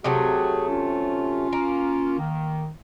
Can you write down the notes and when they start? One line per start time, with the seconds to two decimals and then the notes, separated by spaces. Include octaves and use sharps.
0.04 C3 F#3 A3 F#4 G#4
0.69 C#4 F4
1.53 A#3
2.19 D#3